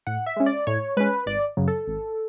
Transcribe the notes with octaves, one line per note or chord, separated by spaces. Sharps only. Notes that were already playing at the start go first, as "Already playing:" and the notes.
A2 F#5
E5
G#3 C#4
D5
A2 C#5
G#3 C#4 B4
G#1 D5
F#2 C#3 F#3
A4
G#1